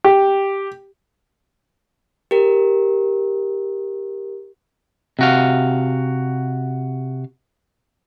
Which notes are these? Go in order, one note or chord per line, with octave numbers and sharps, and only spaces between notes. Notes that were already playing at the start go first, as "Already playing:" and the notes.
G4
G4 A#4
C3 F#4 F5